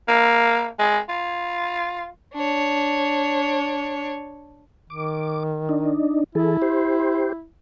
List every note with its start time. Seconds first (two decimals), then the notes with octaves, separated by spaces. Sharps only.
0.08 A#3
0.79 G#3
1.09 F4
2.35 D4 C#5
4.90 D#3 D6
5.69 D4 D#4
6.35 E3 E4 G#4 A4
6.62 G4 C5